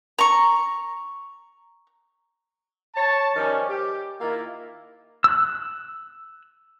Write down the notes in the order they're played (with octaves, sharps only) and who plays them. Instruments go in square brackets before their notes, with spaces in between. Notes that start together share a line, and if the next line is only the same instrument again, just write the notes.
[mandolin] A#5 C#6
[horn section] C#5 A5
D#3 F3 G3 C#4
G4
D#3 A#3 E4 F4 A#4
[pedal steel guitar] E6 F#6